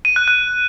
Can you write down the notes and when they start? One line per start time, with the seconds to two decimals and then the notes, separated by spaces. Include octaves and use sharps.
0.05 D#7
0.16 F#6
0.28 F#6